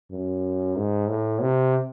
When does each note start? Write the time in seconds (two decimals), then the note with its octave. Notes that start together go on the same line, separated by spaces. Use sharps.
0.12 F#2
0.76 G#2
1.09 A2
1.42 C3